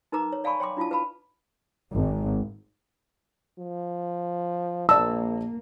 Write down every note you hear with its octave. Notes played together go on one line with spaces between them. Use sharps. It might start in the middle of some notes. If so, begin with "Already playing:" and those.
D#4 A#4 B4 A#5 D6
C#5
D5 F5 G#5 A5 B5 C#6
C#5 G5 C6 D6
D4 E4 F4 F5 A5
B4 F5 A5 B5
G#1
F3
A#1 A#3 D5 A5 E6